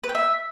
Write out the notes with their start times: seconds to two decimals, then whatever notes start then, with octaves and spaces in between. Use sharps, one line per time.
0.04 B4
0.09 G5
0.15 E5